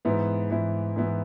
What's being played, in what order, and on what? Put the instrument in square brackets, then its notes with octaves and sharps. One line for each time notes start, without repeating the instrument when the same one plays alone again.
[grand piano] G#2 E3 B3 E4
G#2 E3 B3 E4
G#2 E3 B3 E4